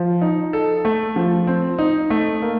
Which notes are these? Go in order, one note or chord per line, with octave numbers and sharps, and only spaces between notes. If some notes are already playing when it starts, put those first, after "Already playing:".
Already playing: F3
D#4
A4
A3
F3
C4
D#4
A3
A#3